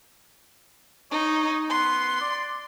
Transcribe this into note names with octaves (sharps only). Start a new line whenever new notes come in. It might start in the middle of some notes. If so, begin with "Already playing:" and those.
D#4 C#5
B3 C6
D5